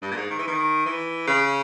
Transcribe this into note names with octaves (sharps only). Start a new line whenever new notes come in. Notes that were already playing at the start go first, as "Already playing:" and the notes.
G2
A#2
G#2
D#3
E3
D#3
E3
C#3